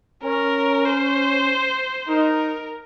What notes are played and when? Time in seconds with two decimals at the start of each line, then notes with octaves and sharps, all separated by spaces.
0.24 C#4 A#4
0.85 C5
2.08 D#4 A#4